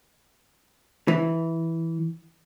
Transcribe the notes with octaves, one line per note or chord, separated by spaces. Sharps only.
E3